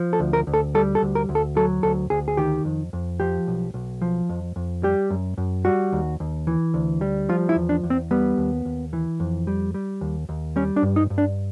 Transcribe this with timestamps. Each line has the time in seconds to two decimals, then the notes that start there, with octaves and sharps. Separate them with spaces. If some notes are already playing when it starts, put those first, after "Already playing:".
Already playing: F3
0.13 A4
0.20 D2
0.33 A#4
0.47 D2
0.54 A4
0.75 G3 A4
0.95 A4
1.02 D2
1.15 A#4
1.29 D2
1.35 A4
1.56 F#3 A4
1.83 D2 A4
2.10 D2 G#4
2.28 G#4
2.37 D#3 G4
2.65 F2
2.93 F2
3.20 F3 G4
3.48 B1
3.74 B1
4.02 F3
4.29 F2
4.56 F2
4.83 G3 G4
5.10 F#2
5.38 F#2
5.65 G3 F#4
5.93 D#2
6.20 D#2
6.47 E3
6.74 D2
7.01 G3
7.29 F3 F4
7.49 E4
7.56 E2
7.69 D4
7.83 E2
7.90 C4
8.11 G3 B3
8.38 D#2
8.65 D#2
8.93 E3
9.20 F2
9.47 G3
9.74 G3
10.01 D#2
10.29 D#2
10.56 G3 C#4
10.76 D4
10.83 G2
10.96 D#4
11.10 G2
11.18 D4